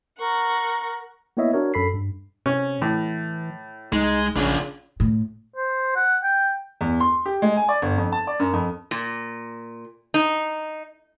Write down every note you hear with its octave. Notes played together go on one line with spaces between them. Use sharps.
A#4 F#5 C#6
A#3 B3 E4 C#5 D#5 E5
D4 F#4 A#4 C#5
F#2 A4 B5 B6 C7
G2
C3 C#4
A2 E3
C2 G#3 D#4
A#1 C#3 D4 F4
A2
C5
F#5
G5
E2
C6
G4
G#3
G#5
D5
G1
F2
A5
D5
F#2
F2
A#2
D#4